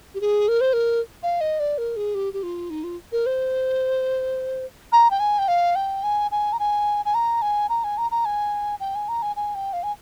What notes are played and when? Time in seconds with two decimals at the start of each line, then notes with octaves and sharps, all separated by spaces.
0.15 G4
0.21 G#4
0.48 A#4
0.61 C5
0.73 A#4
1.23 F5
1.41 D#5
1.60 D5
1.78 A#4
1.96 G#4
2.15 G4
2.33 G4
2.43 F4
2.70 D#4
2.84 F4
3.12 A#4
3.26 C5
4.92 A#5
5.11 G5
5.20 G#5
5.39 G5
5.48 F5
5.75 G5
6.03 G#5
6.31 G#5
6.53 A#5
6.59 G#5
7.05 G#5
7.14 A#5
7.42 G#5
7.69 A#5
7.84 G#5
7.98 A#5
8.11 A#5
8.25 G#5
8.80 G5
8.95 G#5
9.09 A#5
9.22 G#5
9.36 G#5
9.55 G5
9.73 F5
9.83 G#5